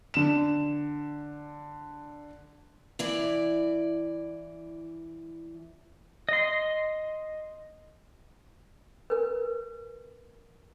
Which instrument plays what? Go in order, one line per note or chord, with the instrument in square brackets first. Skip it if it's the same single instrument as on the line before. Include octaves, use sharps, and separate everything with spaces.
[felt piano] D3 E7
[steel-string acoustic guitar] E3 E4 D5
[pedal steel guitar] D#5 C6
[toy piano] A#4 B4